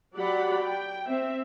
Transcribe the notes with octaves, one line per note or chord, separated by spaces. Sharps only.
F#3 G4 D5 F#5 B5
G5
C4 E5